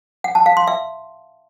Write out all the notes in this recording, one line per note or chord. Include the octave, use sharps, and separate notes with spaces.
F#5
A5
F5
C6
E5